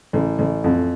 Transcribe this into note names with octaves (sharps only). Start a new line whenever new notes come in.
A1
A1
F2